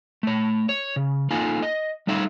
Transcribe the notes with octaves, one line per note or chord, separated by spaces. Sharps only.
A3 C#5
C#5
C#3
A#3 D#4 F4 A4 F5 G#5
D#5
G3 A3 D#4 E5 F5